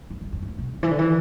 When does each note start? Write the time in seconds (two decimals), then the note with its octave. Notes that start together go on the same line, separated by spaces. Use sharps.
0.10 A2
0.21 G2
0.32 F2
0.42 A2
0.58 B2
0.75 C3
0.83 E3
0.91 D3
0.99 E3